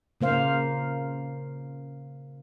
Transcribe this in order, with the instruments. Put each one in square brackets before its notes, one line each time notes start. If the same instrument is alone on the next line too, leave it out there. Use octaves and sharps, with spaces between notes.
[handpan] C#3 A#3 C5 F5